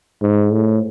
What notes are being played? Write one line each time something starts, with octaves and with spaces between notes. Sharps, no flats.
G#2
A2